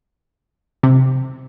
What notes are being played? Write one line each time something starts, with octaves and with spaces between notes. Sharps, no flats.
C3